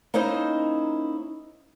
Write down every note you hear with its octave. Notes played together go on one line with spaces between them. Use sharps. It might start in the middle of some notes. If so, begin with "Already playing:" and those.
A#3 C#4 D#4 E4 C5 D#5